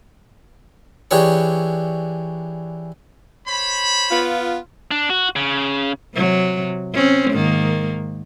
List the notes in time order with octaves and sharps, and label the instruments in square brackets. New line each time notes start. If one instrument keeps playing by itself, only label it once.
[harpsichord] E3 D4 G4 G#4 C#5 C#6
[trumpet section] C5 C#5 B5
[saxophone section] B3 F4
[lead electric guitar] D4
F#4
C#3
[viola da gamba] C3 F#3
C4 C#4
G#2 D#3 A#3